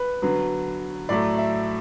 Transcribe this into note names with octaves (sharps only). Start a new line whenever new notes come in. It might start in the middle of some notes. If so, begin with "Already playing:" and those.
Already playing: B4
D3 F#3 B3
A2 F#3 A3 D5
E5